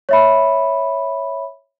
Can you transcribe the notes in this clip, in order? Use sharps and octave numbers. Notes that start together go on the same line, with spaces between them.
C#5 E5 B5